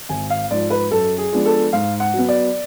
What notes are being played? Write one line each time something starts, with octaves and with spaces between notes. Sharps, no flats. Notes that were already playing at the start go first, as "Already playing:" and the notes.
G#1 G#5
F5
G#2 F3 D5
B4
F#2 A4
G#4
F3 G#3 B3 D4
A4
G#2 F5
F#5
F#3 B3
D5